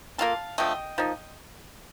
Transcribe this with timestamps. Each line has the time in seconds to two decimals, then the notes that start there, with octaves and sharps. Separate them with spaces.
0.18 A#3 F4 A4 F5 A5
0.58 D3 F3 A3 D#5 G5
0.98 F3 A#3 D#4